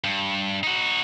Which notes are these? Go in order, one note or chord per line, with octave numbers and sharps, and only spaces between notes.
G2
D#4 F#4